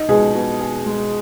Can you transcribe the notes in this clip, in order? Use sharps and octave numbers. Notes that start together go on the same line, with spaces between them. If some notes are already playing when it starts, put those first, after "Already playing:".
Already playing: D#4
B2 G#3 G#4
B2
G#4
G#3